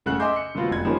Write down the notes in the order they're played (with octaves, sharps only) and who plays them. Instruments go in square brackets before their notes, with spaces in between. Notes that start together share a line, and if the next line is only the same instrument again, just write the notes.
[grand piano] F#1 C#3 A3 F#5 F#6
D#5 E5 G#5 C6 D6 G6
C#7
D3 F3 A3 B3 F4 F#4
F1 G#6
D#3 F3 G3 G#3 A#3 C#4